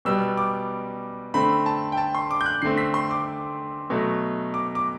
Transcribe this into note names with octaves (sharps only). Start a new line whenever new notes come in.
B2 G3 B3 E6
D6
D3 A3 C4 B5
A5
G5
A5
C6
D6
G6
F#6
D3 A3 C4 C7
B6
C6
D6
B2 F#3 A3
D6
D6